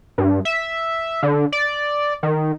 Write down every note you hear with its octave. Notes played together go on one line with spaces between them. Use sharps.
G2
E5
D3
D5
D#3